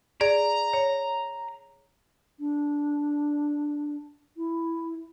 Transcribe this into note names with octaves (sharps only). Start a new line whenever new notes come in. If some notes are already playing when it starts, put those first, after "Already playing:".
G#4 D5 A#5
C#5
D4
E4